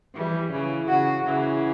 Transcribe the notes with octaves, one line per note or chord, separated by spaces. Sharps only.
E3 G3
C#3 E3
C#3 F#4
C#3 E3